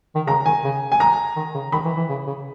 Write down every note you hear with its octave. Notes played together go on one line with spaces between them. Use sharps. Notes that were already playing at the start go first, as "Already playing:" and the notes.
D#3
C#3 A#5
D#3 G#5
C#3
G#5
A#5
D#3
C#3
D#3 B5
E3
E3
C#3
C#3